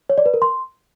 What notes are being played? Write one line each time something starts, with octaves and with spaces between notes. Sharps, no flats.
C#5
D5
B4
A#4
C6